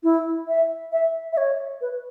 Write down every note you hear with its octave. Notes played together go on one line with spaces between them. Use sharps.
E4
E5
E5
E5
C#5
B4